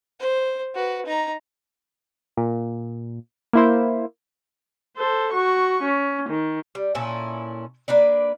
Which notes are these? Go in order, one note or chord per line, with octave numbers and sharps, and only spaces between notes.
C5
F#4 B4
D#4 A#5
A#2
A#3 E4 C5
A4 C5
F#4 C#6
C#4
D#3
G3
A#2 C#4 E4 A4
A#3 D4 B4 D5